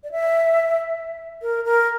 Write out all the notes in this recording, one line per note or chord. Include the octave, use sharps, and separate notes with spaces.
D5
E5
A#4
A#4